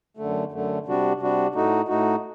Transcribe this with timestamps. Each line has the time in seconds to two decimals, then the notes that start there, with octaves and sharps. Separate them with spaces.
0.17 F#2 D3 A3
0.52 F#2 D3 A3
0.86 C3 G3 D4 F#4
1.20 C3 G3 D4 F#4
1.54 A2 A3 D#4 F#4
1.88 A2 A3 D#4 F#4